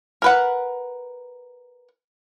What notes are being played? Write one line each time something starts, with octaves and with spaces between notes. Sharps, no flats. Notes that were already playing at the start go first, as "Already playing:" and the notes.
A#4 B4 F#5